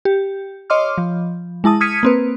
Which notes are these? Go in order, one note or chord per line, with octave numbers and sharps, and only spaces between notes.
G4
C#5 D#5 C6 D6 F6
F3
G#3 E4 A5 D#6
D#6 F6 G#6 B6 C#7 D#7
A#3 C4 B4